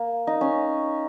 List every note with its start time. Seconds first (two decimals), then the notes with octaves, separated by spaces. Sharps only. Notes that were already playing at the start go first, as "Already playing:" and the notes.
Already playing: A#3
0.27 D#4
0.41 C#4